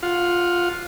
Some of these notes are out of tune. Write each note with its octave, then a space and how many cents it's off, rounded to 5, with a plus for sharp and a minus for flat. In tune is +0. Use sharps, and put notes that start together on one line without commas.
F4 +5 F#5 -10